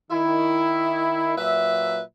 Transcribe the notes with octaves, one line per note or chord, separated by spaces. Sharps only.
D#3 E4
A#2 F#3 B4 E5